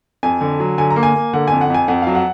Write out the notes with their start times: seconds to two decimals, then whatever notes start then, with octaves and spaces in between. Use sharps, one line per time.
0.23 F2 G#5
0.41 D3
0.60 F#3
0.78 D3 G#5
0.90 A#5
0.96 A#3
1.03 G#5
1.15 A#3
1.33 D3 F#5
1.48 F2 G#5
1.61 F#5
1.70 F2 G#5
1.88 F2 F#5
2.02 F#3 F5
2.15 F#5